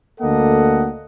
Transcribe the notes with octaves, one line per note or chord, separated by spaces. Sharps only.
D2 A#3 A4 D#5 F#5